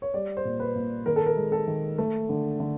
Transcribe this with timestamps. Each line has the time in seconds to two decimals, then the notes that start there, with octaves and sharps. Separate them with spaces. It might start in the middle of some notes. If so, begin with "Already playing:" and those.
0.02 C#5
0.14 G3 D5
0.37 C5
0.45 A#2
0.60 B4
0.75 A#2
1.06 D#3 A#4
1.16 A4
1.26 A#4
1.37 G#3
1.52 A4
1.68 D#3
1.98 A3
2.29 D3
2.60 D3